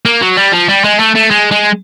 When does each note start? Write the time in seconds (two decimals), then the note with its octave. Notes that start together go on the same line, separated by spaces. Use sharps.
0.06 A#3
0.21 F#3
0.37 G3
0.52 F3
0.69 G3
0.84 G#3
0.99 A3
1.15 A3
1.30 G#3
1.51 G#3